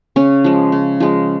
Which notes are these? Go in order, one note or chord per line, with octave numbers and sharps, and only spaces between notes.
C#3 C#4
F3 G#3
C#3
F3 G#3